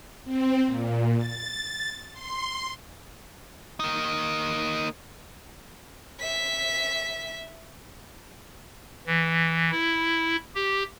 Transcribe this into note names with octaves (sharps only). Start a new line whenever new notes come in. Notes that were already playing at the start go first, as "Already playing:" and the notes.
C4
A#2
A6
C6
A#3 D#4
E5 B6
E3
E4
G4